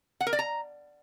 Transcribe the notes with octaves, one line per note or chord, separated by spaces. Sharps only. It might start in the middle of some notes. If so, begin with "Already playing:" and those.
F#5
A#4
D5
A#5